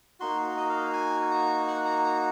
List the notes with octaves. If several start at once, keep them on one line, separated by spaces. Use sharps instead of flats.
A#3 D#4 F#4 C6
D#5
F5
G#5
A#5
F#5
A#5
A#5